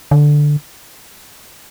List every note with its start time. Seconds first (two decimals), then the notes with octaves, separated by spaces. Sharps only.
0.11 D3